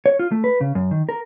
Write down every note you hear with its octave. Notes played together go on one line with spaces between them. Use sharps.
C#5
F4
A3
B4
C#3
F#2
D#3
A#4